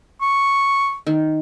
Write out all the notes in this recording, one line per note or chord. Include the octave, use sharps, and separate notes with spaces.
C#6
D#3